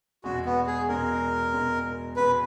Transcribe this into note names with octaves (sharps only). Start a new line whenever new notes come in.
E2 B2 G#3 F#4
B3
G#4
E2 B2 G#3 A#4
E2 B2 G#3
E2 B2 G#3 B4